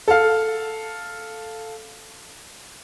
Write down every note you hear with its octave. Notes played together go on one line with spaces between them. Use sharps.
A4 F5